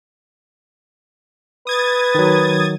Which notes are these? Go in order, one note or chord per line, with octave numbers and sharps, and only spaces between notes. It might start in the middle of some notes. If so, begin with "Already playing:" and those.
B4 D#6 G#6 A6
D#3 F#3